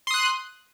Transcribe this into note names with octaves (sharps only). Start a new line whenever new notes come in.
C6 D#6 F#6